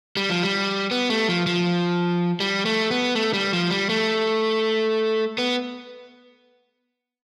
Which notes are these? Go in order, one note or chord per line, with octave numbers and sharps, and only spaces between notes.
G3
F3
G3
B3
A3
F3
F3
G3
A3
B3
A3
G3
F3
G3
A3
B3